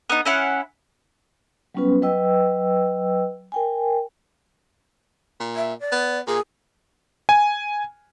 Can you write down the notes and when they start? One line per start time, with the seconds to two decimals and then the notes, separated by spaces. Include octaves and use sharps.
0.10 B3 D#4
0.25 C#4 E4 F#5
1.74 F#3 G3 B3 C#4 F4 B4
2.02 F#3 B4 D#5 G5 E6
3.52 A#4 G5 G#5
5.40 A#2
5.56 E5
5.80 D5
5.92 B3
6.27 A#2 G#4
7.29 G#5